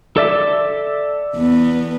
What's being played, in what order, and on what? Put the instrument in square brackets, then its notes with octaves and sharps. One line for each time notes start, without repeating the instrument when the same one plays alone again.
[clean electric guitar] A4 D5 E5
[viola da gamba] E2 B3